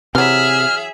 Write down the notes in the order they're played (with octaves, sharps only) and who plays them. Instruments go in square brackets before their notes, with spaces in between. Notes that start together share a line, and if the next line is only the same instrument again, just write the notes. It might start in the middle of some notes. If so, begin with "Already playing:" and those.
[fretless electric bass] C3 [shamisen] E3 F#3 [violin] G#4 E5 [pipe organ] F6